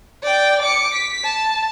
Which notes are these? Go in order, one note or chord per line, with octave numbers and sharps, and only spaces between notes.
D5 G5
D6 C#7
B6
A5